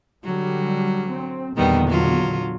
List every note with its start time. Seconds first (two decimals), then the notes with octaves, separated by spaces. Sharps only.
0.24 D3 F#3 G3
1.12 C4
1.56 E2 A#2 D3 D#3 G3 B3
1.87 F#3 F4